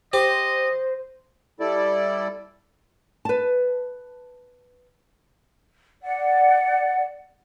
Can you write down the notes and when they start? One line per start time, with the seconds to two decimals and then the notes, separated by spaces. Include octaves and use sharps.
0.13 G4 C5 D#5
1.60 G3 E4 A4 D5
3.25 B4 A5
6.02 D5 F#5